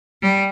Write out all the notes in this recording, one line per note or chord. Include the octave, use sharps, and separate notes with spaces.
G3